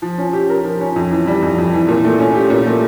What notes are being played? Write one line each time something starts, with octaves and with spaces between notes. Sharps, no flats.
F3
C#4
G4
A#4
F3
C#4
F2
E3
G3
F2
F2
E3
A#2
A3
C#4
G4
A#2
A3